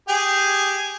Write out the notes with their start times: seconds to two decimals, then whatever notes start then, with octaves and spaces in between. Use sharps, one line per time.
0.09 G4 G#4 G#5